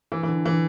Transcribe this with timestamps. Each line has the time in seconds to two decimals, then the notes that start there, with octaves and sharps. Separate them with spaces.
0.12 E3
0.23 E3
0.28 D3
0.46 E3